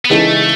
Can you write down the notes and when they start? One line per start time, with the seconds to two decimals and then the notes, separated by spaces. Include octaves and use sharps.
0.05 B3
0.10 C#3 E3 G#3 A3 D#4 A4